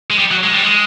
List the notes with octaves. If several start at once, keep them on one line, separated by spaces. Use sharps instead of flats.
G#3
G3
F#3
G#3
G3
G#3